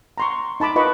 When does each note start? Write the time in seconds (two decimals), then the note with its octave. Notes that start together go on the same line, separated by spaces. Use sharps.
0.18 A#5 C6 C#6
0.60 D#4 A5 B5 D6
0.76 F4 A#4 B4 D#5 B5 C#6